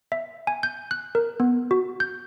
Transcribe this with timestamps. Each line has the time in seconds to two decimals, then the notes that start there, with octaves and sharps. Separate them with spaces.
0.12 E5
0.47 G#5
0.63 G6
0.91 F#6
1.15 A#4
1.40 B3
1.71 F#4
2.00 G6